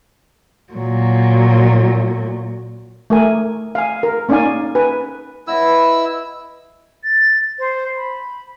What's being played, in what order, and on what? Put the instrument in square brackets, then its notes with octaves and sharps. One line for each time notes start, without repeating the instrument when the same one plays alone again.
[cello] A#2 F#3
[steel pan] A3 A#4 G#5
F5 G#5
A#4
A#3 C#4 D#4 D5 F5 G#5
B4 G#5
[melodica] E4 E6 [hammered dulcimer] B4 D#5 F#5
[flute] A6
C5
B5